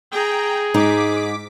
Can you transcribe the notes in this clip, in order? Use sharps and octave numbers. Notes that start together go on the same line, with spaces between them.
G#4 G5 A#5
G#2 D#4 D6 B6